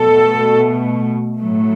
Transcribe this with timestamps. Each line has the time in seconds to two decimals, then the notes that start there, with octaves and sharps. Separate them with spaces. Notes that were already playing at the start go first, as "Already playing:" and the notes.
Already playing: B2 A3 A4
1.40 A2 F#3 A3